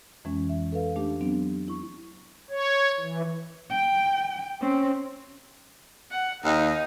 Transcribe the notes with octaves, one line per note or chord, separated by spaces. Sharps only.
F2 E3 G#3 C#4
E5
A4 B4 F5
A3 D4 G4
F#3 B3 C4 D4
E4 C#6
C#5
E3
G5
C4 C#4
F#5
D#2 D#4